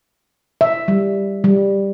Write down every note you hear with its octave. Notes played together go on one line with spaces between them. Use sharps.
E5
G3
G3